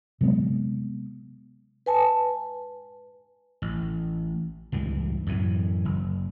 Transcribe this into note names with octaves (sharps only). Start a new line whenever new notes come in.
C3 F#3 G#3 B3
B4 G#5 A5
A1
C#2 G2 E3
F#2 A2 E3
F#1